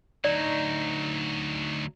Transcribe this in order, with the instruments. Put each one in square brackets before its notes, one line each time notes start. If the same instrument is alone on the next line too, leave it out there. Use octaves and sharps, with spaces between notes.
[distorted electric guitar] D2 F#3 [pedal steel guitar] D#4 [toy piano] D5